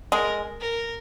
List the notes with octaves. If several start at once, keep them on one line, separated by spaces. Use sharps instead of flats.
G#3 A#4
A#4